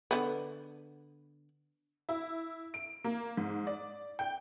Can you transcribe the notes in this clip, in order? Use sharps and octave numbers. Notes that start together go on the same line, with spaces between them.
D3 G#3 B3
E4
D7
A#3
G#2
D5
G5